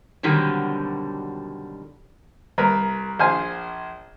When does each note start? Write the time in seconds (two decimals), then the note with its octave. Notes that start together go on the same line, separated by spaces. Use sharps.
0.23 B2 D3 D#3 F#3 G3 C4
2.58 C2 A#4 B4
3.20 A#1 C5 F5 G#5